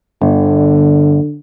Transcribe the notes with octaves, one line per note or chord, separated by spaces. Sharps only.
G1 D3